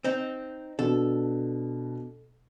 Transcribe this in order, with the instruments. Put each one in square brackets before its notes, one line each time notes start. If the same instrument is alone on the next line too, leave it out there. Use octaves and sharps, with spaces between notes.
[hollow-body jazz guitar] C4 D#4
[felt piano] B2 D4 [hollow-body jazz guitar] A4